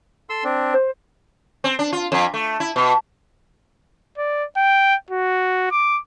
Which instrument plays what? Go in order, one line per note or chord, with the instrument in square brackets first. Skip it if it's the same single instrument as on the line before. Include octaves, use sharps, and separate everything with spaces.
[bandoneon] A4 C6 E6
C4 D4
[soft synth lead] C5
[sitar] C4
D4
F4
F2
A3
E4
B2
[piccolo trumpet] D5
G5
F#4
D6